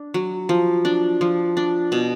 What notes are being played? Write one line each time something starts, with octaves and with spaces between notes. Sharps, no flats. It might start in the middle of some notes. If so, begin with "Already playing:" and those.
Already playing: D4
F#3
F3
D4
F3
D4
B2